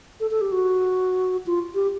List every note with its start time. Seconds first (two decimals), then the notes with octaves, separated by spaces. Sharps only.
0.20 A4
0.31 A4
0.41 G4
0.52 F#4
1.46 F4
1.75 G4